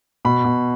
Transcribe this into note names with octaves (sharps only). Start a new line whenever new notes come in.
B2 B5
B2